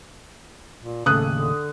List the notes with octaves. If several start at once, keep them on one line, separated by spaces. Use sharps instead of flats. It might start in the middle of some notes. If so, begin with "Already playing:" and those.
A#2
D#2 A2 C#3 A4 D#6 F#6
D3